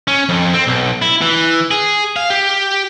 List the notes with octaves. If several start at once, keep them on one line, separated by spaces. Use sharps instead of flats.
C#4
F2
C4
B1
E4
E3
G#4
F5
G4